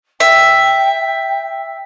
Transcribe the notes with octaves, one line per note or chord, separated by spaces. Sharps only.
E5 G5